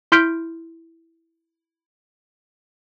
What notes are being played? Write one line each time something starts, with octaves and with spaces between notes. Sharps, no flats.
E4 C6 F6 G6 B6 D7